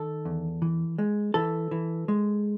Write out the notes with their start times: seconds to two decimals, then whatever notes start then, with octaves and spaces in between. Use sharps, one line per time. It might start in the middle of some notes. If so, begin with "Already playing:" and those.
Already playing: D#3 A4
0.25 E2
0.62 E3
0.98 G#3
1.34 E3 A4
1.71 E3
2.08 G#3